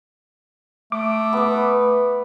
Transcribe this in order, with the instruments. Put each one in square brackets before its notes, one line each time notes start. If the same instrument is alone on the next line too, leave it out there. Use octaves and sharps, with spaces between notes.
[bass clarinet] A3 [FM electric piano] D6
[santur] B3 B4